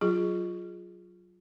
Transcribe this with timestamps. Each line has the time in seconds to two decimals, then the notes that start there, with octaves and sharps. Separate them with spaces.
0.01 F#3 F4 G#4